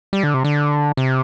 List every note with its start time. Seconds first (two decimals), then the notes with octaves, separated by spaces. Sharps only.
0.13 G3
0.23 D3
0.34 C3
0.44 D3
0.97 C3